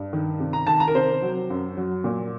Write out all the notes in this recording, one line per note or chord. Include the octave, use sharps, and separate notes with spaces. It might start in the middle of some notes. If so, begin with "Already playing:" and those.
Already playing: G2
D#3
C3
A#5
D#3 A5
A#5
A#4
C3 C5
F#3
F#2
F#3
A#2